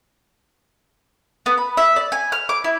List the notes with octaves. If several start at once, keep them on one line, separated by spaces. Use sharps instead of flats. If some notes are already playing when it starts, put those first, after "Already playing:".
B3
B5
E5
D5
G#5
F6
D6
E4